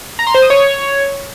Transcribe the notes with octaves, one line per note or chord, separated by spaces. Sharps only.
A#5
C6
C5
D#6
C#5